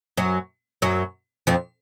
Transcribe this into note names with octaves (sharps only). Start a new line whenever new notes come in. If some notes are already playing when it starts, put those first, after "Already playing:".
F#2 F#3
F#2 F#3
F2 F3